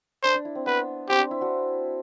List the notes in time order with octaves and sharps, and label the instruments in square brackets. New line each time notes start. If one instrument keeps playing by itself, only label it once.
[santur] D4 [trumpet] C5
[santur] D4
E4
C4
[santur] B3 [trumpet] B4
[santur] C4 [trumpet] G4
[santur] D4
E4
D4 F#4